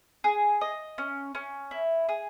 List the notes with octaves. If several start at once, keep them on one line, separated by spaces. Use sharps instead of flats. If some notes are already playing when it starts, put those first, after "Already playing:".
G#4
D#5
C#4
C#4
E4
G#4